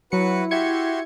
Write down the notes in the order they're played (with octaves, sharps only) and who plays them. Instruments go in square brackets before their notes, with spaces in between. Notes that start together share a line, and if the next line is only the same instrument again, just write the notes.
[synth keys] F#3 C#7 [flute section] E4 [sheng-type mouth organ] F#4 B4
[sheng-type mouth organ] F#4 G4 C6 [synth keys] E5 G#6 C#7